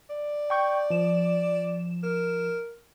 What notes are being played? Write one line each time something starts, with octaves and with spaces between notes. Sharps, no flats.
D5
G5 C#6 G6
F3 E7
A#4